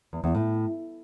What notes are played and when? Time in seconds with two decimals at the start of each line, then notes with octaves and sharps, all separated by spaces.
0.13 E2
0.24 E2
0.35 A2